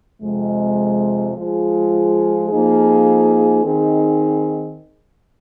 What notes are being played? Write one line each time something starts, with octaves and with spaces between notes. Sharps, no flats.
F2 C3 G#3
F3 G#3 F4 G#4
F2 F3 A#3 D#4 G#4
D#3 C4 D#4 G#4